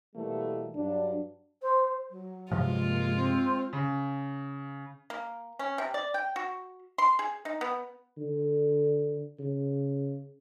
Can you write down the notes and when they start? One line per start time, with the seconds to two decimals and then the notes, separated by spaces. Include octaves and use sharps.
0.15 B2 E3 G3 A3 A#3
0.75 G2 F#3 D4
1.61 C5
2.09 F#3
2.52 G2 C3 F3 G#3 F4
2.83 A#3
3.15 C4
3.73 C#3
5.10 A#3
5.59 C#4
5.78 C3
5.94 D5
6.14 G5
6.36 F#4
6.98 C6
7.19 G#4
7.45 D#4
7.61 B3
8.17 D3
9.39 C#3